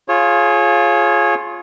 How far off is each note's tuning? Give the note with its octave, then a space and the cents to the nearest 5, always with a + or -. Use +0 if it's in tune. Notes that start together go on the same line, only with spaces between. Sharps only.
F4 +0 G#4 +20 C#5 -20